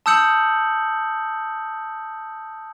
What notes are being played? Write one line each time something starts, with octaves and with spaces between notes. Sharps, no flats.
A5 D#6 E6 G6 C#7 F#7